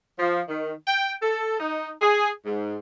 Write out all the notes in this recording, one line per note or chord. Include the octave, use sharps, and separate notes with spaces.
F3
D#3
G5
A4
D#4
G#4
G#2